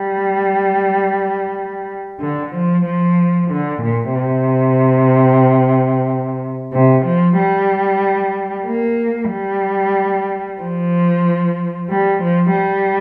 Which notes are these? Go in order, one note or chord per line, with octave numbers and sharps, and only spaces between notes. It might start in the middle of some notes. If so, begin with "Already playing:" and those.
Already playing: G3
D3
F3
F3
D3
A#2
C3
C3
F3
G3
A#3
G3
F3
G3
F3
G3